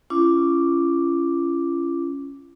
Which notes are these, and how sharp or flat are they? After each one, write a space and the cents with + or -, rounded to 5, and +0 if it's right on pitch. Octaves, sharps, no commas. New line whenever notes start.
C#4 +0 F4 -45 D6 +0